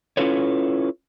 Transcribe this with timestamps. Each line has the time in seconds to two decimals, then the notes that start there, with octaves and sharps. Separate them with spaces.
0.17 C#4 E4 F4 A4 B4 C#5